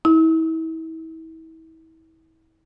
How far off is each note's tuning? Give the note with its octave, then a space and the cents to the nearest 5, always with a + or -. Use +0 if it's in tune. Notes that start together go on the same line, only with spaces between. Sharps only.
E4 -35